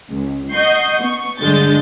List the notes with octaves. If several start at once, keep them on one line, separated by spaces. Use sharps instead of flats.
C#2
D#5 F#5 C#6 G6 C7
B3 C#6
G2 D3 G#3 G6 A6